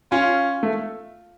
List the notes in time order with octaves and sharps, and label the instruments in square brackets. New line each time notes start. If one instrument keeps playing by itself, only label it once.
[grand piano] C#4 [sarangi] F4
[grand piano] A3